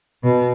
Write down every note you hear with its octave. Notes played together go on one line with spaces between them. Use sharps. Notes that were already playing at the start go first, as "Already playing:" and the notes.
B2